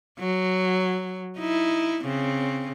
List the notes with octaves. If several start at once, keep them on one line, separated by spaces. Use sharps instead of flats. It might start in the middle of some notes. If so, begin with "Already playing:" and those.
F#3
D#4 E4
C#3 C4